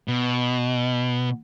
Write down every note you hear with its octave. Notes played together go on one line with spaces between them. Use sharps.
B2